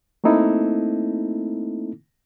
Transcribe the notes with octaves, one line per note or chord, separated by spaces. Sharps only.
A3 A#3 C4 D#4 E4 A4